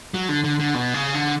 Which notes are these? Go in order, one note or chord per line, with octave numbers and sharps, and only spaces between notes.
F#3
D3
D3
D3
B2
C#3
D3